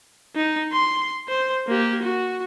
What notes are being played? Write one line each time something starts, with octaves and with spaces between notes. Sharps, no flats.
D#4
C6
C5
A#3 G4
F#4